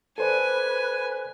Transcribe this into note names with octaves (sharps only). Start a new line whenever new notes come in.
A4 B4 C5 D5 G#5